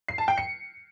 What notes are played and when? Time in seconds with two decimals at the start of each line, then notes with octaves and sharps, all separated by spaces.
0.08 C7
0.18 A5
0.28 G5
0.38 C#7